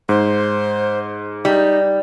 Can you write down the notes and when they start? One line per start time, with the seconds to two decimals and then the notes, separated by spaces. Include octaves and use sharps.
0.09 G#2 C5
1.45 G3 D#4